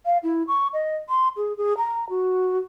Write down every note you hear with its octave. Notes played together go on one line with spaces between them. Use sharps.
F5
E4
C#6
D#5
C6
G#4
G#4
A#5
F#4